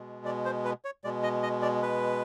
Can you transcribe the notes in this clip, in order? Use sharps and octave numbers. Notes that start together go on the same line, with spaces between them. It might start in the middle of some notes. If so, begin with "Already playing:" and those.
Already playing: B2 G#3
D5
C5
B4
C#5
B2 G#3 D5
D#5
D#5
D5
B4